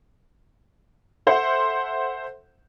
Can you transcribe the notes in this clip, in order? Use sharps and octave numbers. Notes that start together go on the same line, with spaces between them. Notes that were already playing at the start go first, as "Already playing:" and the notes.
A4 C5 E5 F#5 C6